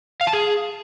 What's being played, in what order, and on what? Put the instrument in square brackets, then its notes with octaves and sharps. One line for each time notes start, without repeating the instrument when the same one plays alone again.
[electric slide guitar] F5
A5
G#4